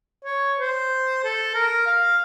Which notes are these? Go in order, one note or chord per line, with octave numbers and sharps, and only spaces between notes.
C#5
C5
A4
A#4
F5